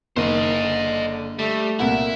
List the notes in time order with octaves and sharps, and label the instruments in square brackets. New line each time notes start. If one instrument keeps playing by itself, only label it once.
[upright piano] F#1 [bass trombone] D#3 [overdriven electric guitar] C5 D#5
[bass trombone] D3
[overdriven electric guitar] G3 [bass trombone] A3
[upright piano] C2 A#2 F#5 [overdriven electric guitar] E4 E5